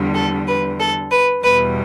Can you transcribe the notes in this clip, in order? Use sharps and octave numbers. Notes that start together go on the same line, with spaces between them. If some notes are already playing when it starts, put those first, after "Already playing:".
Already playing: E2 D3 G3
A4
B4
A4
B4
E2 B2 G3 B4